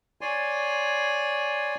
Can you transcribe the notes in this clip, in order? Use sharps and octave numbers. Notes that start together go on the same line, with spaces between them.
C#5 D5 G#5 C6